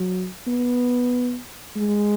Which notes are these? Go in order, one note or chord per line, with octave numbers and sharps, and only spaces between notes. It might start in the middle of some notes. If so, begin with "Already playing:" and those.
Already playing: F#3
B3
G#3